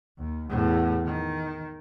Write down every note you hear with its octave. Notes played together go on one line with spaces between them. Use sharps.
D#2
E2 A2
D#3